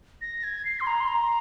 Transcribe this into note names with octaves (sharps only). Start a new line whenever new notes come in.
A#6
G#6
C7
C6
A#5
C6
A#5